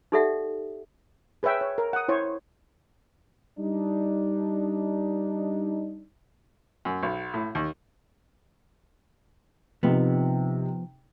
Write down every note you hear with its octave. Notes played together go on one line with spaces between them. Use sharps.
D#4 G4 A4 D5 E5 F#5
G#4 B4 C#5 E5 G5
C#5
A#4
F#5 D#6
E4 C5 C#5
G3 D4 D#4
F#2
B1
A2
D#2
C3 F3 B3 D#4